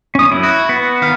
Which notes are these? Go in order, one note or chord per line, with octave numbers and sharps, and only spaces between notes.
C#4 D#6
F#2 E4
F#4
B3
D#3 F5